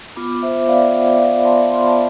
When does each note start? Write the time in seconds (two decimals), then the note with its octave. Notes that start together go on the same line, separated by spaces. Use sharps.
0.16 B3 F4 B5 D6
0.43 C5 E5
0.68 B3 F4 D5 F5
0.93 E5 G5
1.19 B3 F4 D5 F5
1.38 B5
1.44 A5 C6
1.70 B3 F4 C6
1.78 B5
1.87 A5